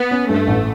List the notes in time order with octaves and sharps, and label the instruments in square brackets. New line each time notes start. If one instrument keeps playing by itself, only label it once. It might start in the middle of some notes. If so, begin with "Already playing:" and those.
Already playing: [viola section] B3
[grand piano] C#4
[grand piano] G2 [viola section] A3
[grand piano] A1